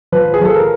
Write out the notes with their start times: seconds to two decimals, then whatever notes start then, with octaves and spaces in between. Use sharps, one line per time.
0.12 F3 B4
0.34 G#4
0.41 F3 A4
0.55 A#4